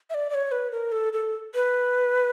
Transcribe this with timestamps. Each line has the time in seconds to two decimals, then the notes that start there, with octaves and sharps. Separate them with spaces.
0.10 E5
0.14 D5
0.30 D5
0.34 C#5
0.52 B4
0.72 A#4
0.92 A4
1.13 A4
1.55 B4